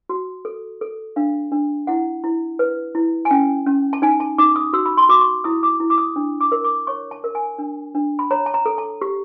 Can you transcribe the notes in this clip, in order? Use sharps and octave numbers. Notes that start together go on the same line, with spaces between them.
F#4
A4
A4
D4 F5
D4
E4 F#5
E4
B4
E4
G#5
C#4 G5
C#4
A5
D#4 G#5
A5
D#4 D6
D#6
F#4 E6
B5
C6
F#4 D6
C#6
E4 D#6
D6
E4
D6
D#6
D4
D6
A#4
D6
C#5 C#6
A5
A#4
G#5
D4
D4
B5
C#5 A#5
A5
A#5
A4
A5
G4